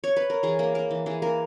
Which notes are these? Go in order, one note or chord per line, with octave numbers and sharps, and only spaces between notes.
C#5
B4
A#4
E3 G#4
A#3 A#4
A#3 A#4
E3
E3 G#4
A#3 A#4